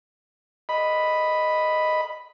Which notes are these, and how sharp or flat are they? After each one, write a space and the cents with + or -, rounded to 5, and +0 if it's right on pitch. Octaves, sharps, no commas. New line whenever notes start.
D#5 -5 B5 +0